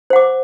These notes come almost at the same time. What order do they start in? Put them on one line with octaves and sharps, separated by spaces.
C5 F#5 D6